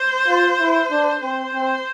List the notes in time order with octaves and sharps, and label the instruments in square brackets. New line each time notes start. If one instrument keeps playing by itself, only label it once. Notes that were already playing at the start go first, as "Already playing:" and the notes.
Already playing: [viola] C5
[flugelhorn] F4
E4
D4
[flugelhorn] C4 [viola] C5
[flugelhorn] C4